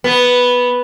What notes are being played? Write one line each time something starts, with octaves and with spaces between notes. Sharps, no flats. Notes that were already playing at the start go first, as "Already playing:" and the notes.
B3